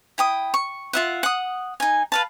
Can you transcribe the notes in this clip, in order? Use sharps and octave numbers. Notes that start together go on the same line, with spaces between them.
E4 G5 D#6
C#6
F4 E5 F#5
F#5 D#6
D#4 G#5
B4 F5 A5